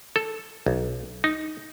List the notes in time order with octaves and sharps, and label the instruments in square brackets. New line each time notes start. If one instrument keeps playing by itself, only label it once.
[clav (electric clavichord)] A4
B1
D#4